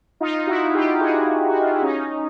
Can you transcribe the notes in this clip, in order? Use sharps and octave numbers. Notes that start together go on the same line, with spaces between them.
D#4 F4
E4 F#4
F4 G4
F#4 G#4
F#4
F4
E4
C#4 D#4